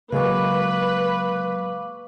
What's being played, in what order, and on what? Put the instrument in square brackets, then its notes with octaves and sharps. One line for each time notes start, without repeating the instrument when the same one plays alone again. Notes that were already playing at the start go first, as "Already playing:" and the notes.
[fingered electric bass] C#3 [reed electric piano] F#3 G#3 A#3 [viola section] B4 [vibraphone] F5 C#6 D6